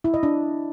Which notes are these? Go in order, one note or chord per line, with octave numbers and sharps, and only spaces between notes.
E4
D#5
D4